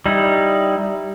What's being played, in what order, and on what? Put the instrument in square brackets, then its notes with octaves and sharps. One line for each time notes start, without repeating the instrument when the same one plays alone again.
[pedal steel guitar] G3 D#4 E4